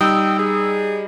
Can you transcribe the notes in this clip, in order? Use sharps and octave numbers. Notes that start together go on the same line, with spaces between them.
G3 D#4 G5 D#6 E6
G#4